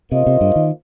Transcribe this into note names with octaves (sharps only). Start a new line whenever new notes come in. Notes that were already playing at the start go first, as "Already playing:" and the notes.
C3 A#3 F4 C5 D#5
C3
G2
D#3